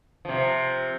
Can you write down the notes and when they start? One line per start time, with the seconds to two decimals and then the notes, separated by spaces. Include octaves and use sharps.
0.25 C3 F3